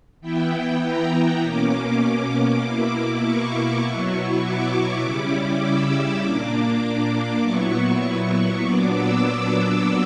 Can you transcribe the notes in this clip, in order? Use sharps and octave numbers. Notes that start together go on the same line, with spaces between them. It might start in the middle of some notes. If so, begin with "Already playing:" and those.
E3 B3 E4 G5
A#5
B2 A#3 C#4 D6
D6
D6
B2 A#3 E4
C#6
B2 F#3 B3 E4
D6
C#3 G3 C#4 E4 D6
D6
E6
D6
A#2 A#3 D4
A#2 F#3 B3 E4 C#6
A#2 F#3 B3 D4 D6
E6
D6
D6